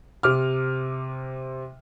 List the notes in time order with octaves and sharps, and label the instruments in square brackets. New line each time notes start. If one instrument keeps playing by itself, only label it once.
[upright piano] C3 D6 F6